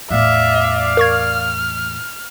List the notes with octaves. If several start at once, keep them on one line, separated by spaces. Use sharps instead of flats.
E2 A2 D5 E5 F5
A#4 C#6 F6 G#6